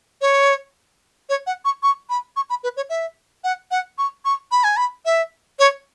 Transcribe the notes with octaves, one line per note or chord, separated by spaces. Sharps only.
C#5
C#5
F#5
C#6
C#6
B5
C#6
B5
B4
C#5
E5
F#5
F#5
C#6
C#6
B5
G#5
B5
E5
C#5